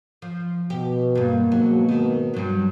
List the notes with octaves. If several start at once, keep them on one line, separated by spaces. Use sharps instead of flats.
F3
B2 G4
E2 G2 A#3
G#2 B2 F#3
D#3
G2 F#3